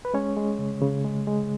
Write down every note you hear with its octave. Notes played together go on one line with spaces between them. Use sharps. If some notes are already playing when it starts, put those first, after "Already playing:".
B4
G#3 C#4 C#5
G#3
C#3
C#3
G#3
G#3